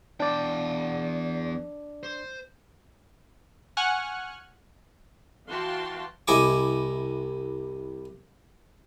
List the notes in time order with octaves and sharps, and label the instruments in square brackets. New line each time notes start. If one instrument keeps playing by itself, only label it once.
[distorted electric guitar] E2 G5 [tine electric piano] D4 D5
[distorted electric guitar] C5
[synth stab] F#5 G#5 C#6 F6 F#6
[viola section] E3 F#4 F5 G5 A5 C6
[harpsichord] C2 E4 D#5 G#5 C#6 D6